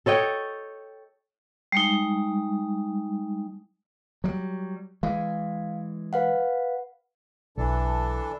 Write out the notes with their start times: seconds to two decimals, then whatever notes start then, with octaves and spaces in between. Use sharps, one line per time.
0.06 A4 C#5 D#5 G5
1.72 G3 G#3 D#4
4.24 F#3 G3
5.03 E3 G#3 F5
6.13 B4 F5 F#5
7.58 B1 E3 D4 A4